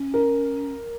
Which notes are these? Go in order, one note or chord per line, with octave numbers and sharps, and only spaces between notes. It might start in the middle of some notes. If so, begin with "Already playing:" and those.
Already playing: C#4
A#4